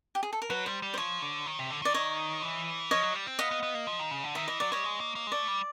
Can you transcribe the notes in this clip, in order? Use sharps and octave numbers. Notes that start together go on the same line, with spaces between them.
G4
G#4
A4
A#4
F#3 B4
G3 C5
G3
C5
F3 C#5
D3
D#3
C3
D3
D#3 D5
C#5 D#5
E3
F3 C#5 D#5
F#3
G3
C4
B3 D#5 F5
B3
B3
A#3
F3
D#3
C#3
D3
D#3 E5
E3 D#5
F#3 D5
G3 C#5 D#5
G#3
A#3
A#3
G#3
A3 D5
G3